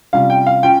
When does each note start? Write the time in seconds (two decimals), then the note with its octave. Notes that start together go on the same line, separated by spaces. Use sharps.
0.13 C3 G3 C#4 F4 F5
0.30 G5
0.47 F5
0.63 C#4 F4 G5